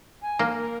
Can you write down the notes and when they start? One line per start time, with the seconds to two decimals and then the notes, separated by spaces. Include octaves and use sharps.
0.22 G#5
0.39 A#3
0.54 A#4